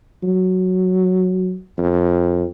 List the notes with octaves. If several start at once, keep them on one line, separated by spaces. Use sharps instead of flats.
F#3
F2